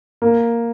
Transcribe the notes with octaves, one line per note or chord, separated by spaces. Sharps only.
A#3